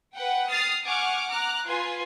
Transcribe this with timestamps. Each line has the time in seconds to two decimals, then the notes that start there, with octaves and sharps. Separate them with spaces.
0.14 B4 F#5 G5
0.50 D#6 F6 A6 C7
0.85 F#5 G#5 C#6 D6 F6
1.30 A#5 D6 F6 F#6
1.67 F4 B4 G#5 C6